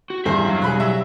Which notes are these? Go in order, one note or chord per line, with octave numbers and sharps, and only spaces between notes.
F#4
E2 G2 C4 D4 A4 C5 E5
F#3 C4 D4 F5
B2 G3 G#4 B5 F#6
F#3 E5